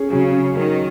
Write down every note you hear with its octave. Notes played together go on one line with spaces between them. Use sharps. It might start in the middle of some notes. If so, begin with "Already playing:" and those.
Already playing: C#4 G#4
C#3 F#3
C#4
D#3 F#3